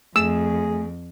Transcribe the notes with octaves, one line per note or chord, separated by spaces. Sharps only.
F2 A3 G#4 E6